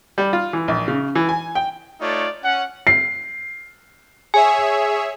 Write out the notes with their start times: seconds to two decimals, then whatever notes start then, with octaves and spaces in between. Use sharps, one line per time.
0.18 G3
0.33 F4
0.53 E3
0.68 A#1
0.88 C#3
1.15 E3
1.29 G#5
1.55 G5
2.01 A3 D#4 F4 C#5 D5
2.43 C#4 F#5
2.87 C7
4.34 G#4 C#5 E5 G#5